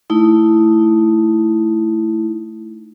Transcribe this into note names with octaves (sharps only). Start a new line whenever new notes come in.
A3 D#4 E4